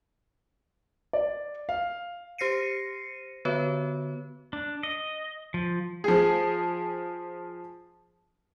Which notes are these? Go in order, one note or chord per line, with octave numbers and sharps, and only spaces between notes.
D5
F5
G4 C5 A#6 C7 C#7 D#7
D3 B3 F#4 B4 C#5
D4
D#5
F3
F3 G#4